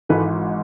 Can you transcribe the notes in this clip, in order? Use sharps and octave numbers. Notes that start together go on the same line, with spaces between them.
G#1 G#2 E3 A4 B4